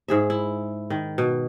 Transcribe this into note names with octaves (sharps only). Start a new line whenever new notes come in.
G#2 G#4 E5
E4
D#3
B2